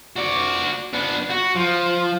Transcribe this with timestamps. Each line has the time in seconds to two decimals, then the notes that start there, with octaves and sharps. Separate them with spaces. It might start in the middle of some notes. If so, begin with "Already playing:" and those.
0.16 F#4 D5
0.93 B3 D4
1.30 F#4
1.56 F3